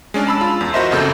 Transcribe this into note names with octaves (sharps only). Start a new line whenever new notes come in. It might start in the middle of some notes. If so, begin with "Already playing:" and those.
G#3 C#4 D4
A5 B5 E6
F4
E2
F#4 A#4 C5 D#5 E5 C6
G1 F2 C#3 A#3 A4 G6